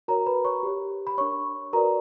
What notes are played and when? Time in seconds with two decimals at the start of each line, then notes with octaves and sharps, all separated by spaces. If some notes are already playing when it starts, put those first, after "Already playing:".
0.08 F#4 A#4 C#5 A#5
0.26 B4 B5
0.45 C#5 C#6
0.63 G4 C#5
1.07 B5
1.18 D4 A#4 C#5 C#6
1.73 F#4 A#4 B4 D5 A#5